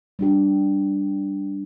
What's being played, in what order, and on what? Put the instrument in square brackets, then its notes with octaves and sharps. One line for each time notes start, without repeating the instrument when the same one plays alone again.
[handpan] G3 D4 G4